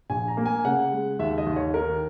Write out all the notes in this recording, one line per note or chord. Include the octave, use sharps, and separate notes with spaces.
A#1 G#5
A#5
A#3
G#5
C#3 F#5
G#3
D#2 E5
D#5
D#2
C#5
D#3 A#4